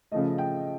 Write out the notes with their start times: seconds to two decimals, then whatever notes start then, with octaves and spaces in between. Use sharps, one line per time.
0.12 C#3 F3 A3 D#5
0.38 G5